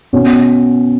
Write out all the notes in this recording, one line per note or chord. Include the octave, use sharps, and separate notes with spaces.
B2 C#4